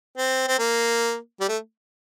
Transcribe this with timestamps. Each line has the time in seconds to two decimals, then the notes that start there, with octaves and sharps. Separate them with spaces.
0.17 C4
0.47 C4
0.59 A#3
1.40 G3
1.49 A3